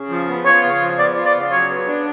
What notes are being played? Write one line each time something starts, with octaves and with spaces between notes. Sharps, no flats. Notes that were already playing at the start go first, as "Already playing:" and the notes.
Already playing: C#3
F3
B3
F4 C#5
C#3
F3
B3 D5
F4
D5
C#3
F#3 C#5
B3
D4